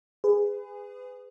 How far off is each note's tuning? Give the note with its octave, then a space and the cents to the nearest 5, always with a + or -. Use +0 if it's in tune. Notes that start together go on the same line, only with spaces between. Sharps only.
G#4 -15 B4 +30